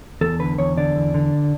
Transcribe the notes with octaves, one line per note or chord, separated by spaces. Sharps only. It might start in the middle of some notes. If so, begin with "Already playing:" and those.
E2 A4
D3 B4
E2 C#5
D3 D5
E2
D3